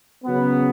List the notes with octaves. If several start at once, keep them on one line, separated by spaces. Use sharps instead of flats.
C#3 F#3 B3